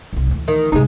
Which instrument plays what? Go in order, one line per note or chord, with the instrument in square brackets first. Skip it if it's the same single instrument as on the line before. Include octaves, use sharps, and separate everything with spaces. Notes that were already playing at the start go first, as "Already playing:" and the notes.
[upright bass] C2 D#4
D2 E3
[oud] D#3
[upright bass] G2 C3 [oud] G#3 D#4